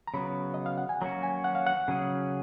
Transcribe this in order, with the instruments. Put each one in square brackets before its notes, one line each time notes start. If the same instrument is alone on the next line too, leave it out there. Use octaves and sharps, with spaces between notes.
[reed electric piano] A#5
[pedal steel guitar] C#3 F#3 B3 [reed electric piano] B5
[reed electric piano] D#5
F5
F#5
G#5
[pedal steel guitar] F#3 A#3 C#4 F#4 [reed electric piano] A#5
[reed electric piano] G#5
F#5
F5
F#5
[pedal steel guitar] C#3 F#3 C#4 G#4